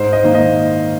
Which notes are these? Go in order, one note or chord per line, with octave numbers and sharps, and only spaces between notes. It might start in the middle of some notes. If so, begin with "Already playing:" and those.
Already playing: G#2 C5
D#5
D#3 A#3 D#4
D#5